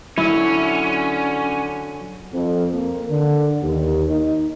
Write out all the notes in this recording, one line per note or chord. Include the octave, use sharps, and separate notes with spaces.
D3 F#3 C#4 E4
F2
A#3
D3
D#2
D#4